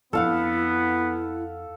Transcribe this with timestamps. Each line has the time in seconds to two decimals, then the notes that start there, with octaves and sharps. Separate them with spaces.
0.13 F2 B3 D4 E4 A4 F5 F#5